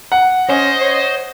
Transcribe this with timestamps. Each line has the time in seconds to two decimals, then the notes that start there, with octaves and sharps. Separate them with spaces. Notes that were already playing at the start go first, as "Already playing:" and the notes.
0.12 F#5
0.49 C#4 C5 D#5
0.81 C#5